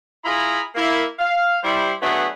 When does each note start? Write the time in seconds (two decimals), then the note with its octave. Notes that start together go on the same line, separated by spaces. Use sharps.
0.25 E4 F4 G#4 G#5 A#5 B5
0.75 A#3 E4
1.19 F5
1.63 G3 E4 C5
2.01 F#3 A3 B3 D4 G#4 B4